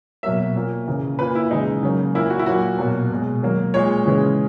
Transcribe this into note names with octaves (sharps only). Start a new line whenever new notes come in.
B2 F#3 A#3 E5
A#2 A#3
C#3 E3 A#3
A#2 A#3 B4
E4
C#3 E3 G#3 D#4
C#3 F#3 A#3
A#2 A#3 E4
F#4
E4
A#2 F#3 A#3 F#4
B2 F#3 A#3
B2 G#3
D#3 F#3 A#3
A#2 G#3 C#5
C#3 E3 G#3